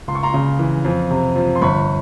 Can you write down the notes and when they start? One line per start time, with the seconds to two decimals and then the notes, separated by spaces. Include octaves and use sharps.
0.08 C#2 C6
0.15 C#6
0.23 A#5 C6
0.34 C#3
0.59 E3
0.85 F2
1.10 C3
1.36 F3
1.55 C6
1.61 G1 B5 C#6